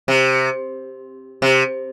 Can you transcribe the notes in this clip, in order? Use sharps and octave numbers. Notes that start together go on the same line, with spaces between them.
C3
C3